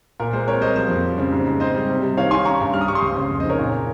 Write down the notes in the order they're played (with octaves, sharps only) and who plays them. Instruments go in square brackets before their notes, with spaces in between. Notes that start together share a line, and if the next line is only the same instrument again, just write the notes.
[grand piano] A#2 A#4
G#3 C5
C4 A#4 C#5
G3 C5 D#5
F3 C5
F2
G3
C#3
G#2
G#2
C4 C5 D#5
G3
C3
G3
D#3 C#5 F5
D#3 G#5 C6
C#4 A#5 C#6
G2
G3 F6
D#6
G3 C#6
C6 D#6
C#2
C#3
F2
C5 D#5
D#3 A#4 C#5
A#2
C#4